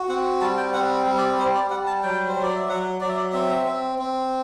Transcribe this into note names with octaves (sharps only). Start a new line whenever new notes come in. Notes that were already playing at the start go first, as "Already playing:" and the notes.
Already playing: F#4
C4 F#5
G3 A5
G5
C4 F#5
G3
D5
G3 C5
D5
G3 F#5
A5
F#3 G5
C5
F#3
D5
E5
F#3 F#5
F#3 D5
E5
D5
C4 E5
C4
C4